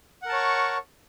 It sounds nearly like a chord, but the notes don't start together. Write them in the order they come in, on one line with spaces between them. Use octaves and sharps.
F#5 A#4 A5 C#5 C#6